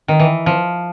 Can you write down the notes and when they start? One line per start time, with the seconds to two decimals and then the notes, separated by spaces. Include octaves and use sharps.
0.08 D#3
0.20 E3
0.46 F3